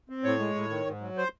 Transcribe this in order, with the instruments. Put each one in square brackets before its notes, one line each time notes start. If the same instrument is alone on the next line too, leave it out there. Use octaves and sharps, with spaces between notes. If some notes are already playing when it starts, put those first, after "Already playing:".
[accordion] C4
A2 C#5
G#3
A2
D#3
G#2
F#3
C5